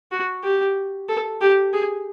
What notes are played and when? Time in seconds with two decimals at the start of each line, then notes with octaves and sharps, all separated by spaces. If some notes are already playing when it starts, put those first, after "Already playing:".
0.12 F#4
0.44 G4
1.08 A4
1.41 G4
1.73 G#4